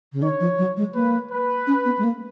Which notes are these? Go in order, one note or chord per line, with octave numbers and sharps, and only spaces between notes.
C#3
D#3 C#5
F3
F#3
G#3
A#3 B4
B4
C#4
B3
G#3
A#3